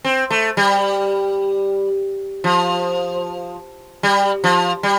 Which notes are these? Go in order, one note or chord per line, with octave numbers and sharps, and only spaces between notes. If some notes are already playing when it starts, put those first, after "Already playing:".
C4
A3
G3
F3
G3
F3
G3